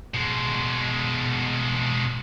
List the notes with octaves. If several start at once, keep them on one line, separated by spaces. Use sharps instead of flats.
B2 G#3